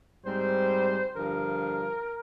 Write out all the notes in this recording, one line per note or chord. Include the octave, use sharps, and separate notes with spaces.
G#2 G3 C4 C5
G2 D3 F3 A#4